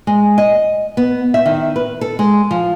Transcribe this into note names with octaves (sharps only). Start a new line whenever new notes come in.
G#3
D#5
B3
E5
D#3
B4
A4
G#3
F3